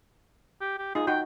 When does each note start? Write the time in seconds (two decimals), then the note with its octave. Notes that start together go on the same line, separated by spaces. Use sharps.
0.61 G4
0.79 G4
0.95 D#4 F4 G#4
1.07 D#4 F#4 G5